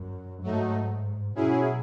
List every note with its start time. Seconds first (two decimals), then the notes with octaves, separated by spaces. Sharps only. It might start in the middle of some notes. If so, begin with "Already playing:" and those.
Already playing: F#2
0.43 G#2 F#3 A3 D#4
1.35 B2 F#3 C#4 E4 G#4